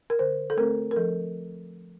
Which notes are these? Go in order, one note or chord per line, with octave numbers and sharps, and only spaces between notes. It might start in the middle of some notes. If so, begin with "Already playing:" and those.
A#4
D3 C5
A4
A3 C4 A#4
A#4
F3 A4